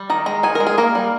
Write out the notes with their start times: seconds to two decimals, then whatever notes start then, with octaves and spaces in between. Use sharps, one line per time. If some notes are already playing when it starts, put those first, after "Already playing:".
Already playing: G3
0.10 D#3 A#5
0.26 G#3 A#5
0.43 D#3 G#5
0.55 A#4
0.60 G#3
0.67 G#4
0.78 A#3 A#4
0.95 G3